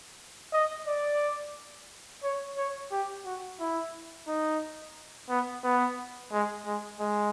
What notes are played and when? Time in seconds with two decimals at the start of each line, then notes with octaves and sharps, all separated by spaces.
0.52 D#5
0.87 D5
2.23 C#5
2.57 C#5
2.91 G4
3.25 F#4
3.59 E4
4.28 D#4
5.29 B3
5.64 B3
6.32 G#3
6.65 G#3
7.00 G#3